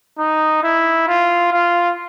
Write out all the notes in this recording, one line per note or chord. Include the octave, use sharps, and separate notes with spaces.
D#4
E4
F4
F4